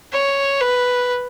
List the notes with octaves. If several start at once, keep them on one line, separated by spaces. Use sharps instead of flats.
C#5
B4